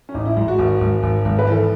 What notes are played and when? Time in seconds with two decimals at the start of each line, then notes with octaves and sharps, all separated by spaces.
0.09 C#4
0.14 A1 D#4
0.25 E4
0.36 G#2 E4
0.48 F#4
0.59 G#1
0.81 G#1
1.03 G#1
1.25 G#1
1.39 B4
1.47 E3 A4